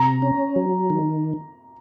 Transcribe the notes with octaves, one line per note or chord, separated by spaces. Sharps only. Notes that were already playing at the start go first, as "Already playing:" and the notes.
Already playing: C3 A#5
C#4
F#3
D#3